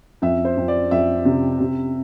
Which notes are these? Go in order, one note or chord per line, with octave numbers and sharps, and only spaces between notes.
F2 E5
C5
F2
D5
F2 E5
C3
C3